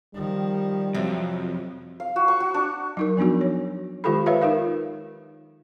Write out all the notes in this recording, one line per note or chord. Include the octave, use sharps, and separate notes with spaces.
D#3 F3 G3
F2 C3 F3 F#3
F5
F#4
C#6
F#4
D4
F#3 D#4 A#4
F3 B3 D4 D#4 F#4
C#5
D#3 G#3 F4 G4 A4 B5
B4 C#5 E5 F5
D#4 F4 A#4 F5